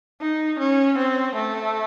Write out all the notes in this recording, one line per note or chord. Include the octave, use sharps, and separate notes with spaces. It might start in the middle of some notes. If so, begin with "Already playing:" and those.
D#4
C#4
C4
A3